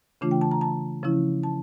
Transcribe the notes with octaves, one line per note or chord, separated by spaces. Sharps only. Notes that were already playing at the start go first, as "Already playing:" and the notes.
C#3 E3 A3 D4 F4
G5
A5
A#5
A5
C#3 F3 C#4 E4
A5